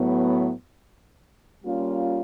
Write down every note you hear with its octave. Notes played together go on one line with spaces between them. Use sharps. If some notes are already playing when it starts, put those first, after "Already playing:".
Already playing: A2 F#3 B3
G3 A#3 C#4 F4